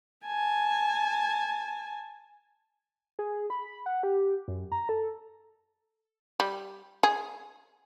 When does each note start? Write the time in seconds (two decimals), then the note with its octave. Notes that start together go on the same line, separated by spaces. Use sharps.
0.26 G#5 A5
3.19 G#4
3.50 B5
3.86 F#5
4.03 G4
4.48 F#2
4.72 A#5
4.89 A4
6.40 G3
7.03 G#4